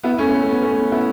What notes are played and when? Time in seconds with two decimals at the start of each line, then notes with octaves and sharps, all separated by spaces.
0.03 B3 E4
0.18 A3 C#4
0.33 A3
0.48 B3
0.62 A3 C#4
0.92 B3 E4